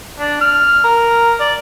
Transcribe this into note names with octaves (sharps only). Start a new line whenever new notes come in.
D4
F6
A#4
D5